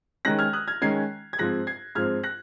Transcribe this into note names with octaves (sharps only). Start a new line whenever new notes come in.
D#3 G#3 C#4 F#6 A#6
F6 G#6
D#6 F#6
F6 G#6
D#3 G#3 C#4 G#6 C7
G#6
G#2 F3 C4 F#6 A#6
G#6 C7
G#2 F3 C4 F6 G#6
F#6 A#6